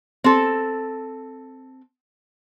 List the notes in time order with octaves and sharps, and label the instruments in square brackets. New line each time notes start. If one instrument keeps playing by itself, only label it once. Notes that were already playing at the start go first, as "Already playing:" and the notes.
[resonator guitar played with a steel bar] C4 A4